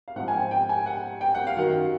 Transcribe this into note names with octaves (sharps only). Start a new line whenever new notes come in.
F5
G#2 F3 F#5
G#5
G5
G5
G#5
F#5
G5
F#5
F5
F#2 D#3 F#3 F#5